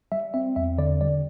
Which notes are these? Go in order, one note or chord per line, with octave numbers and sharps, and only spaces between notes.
G3 E5
C4 E5
E2 E5
D3 D5
G3 D5